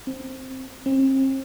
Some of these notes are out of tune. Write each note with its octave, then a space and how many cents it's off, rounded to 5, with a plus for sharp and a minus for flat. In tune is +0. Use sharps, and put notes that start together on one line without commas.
C4 +5
C4 +40